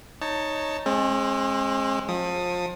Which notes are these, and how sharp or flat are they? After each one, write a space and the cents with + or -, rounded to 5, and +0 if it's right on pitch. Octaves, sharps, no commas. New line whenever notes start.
D#4 +0 C#5 +0 A5 +20
G#3 +10 C4 +45
F3 +30 D#6 +0